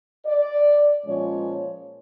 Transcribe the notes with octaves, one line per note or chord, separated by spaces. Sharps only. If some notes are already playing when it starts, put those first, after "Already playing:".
D5
A#2 F3 G#3 C#4 C#5